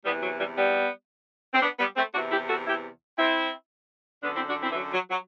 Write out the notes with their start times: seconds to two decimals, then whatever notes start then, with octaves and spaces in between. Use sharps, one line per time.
0.05 E2 C3 E3 G3 B3
0.23 F#3
0.39 E3 G3
0.57 G3 B3
1.54 C4
1.62 B3 D4
1.79 G3 B3
1.96 A3 C4
2.14 E2 C3 E3 D4 F#4
2.31 E4 G4
2.49 F#4 A4
2.66 E4 G4
3.18 C4 E4
4.23 F#2 D3 B3 D4
4.36 C4 E4
4.49 D4 F#4
4.63 C4 E4
4.71 E3
4.76 F#3
4.93 F#3
5.11 F#3